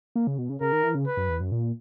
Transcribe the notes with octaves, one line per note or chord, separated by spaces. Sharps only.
A#3
C#3
B2
C#3
C#3 A#4
D#3
E3
C#3
B4
F#2
E2
F#2
A#2